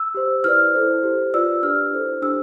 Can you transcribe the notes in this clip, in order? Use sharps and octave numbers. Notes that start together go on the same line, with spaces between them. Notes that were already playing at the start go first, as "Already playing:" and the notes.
Already playing: E6
G4 C5
E4 B4 D5 F6
E4 A4 C5
G4 C5
F4 B4 D5 E6
D4 G4 B4 D5 F6
E4 A4 C5
D4 G4 C5 E6